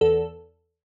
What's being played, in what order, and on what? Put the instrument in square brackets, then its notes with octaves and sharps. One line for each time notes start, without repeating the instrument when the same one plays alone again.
[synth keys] E2 A4